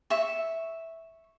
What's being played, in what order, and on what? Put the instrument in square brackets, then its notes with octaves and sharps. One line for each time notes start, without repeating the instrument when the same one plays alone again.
[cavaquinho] E5 C#6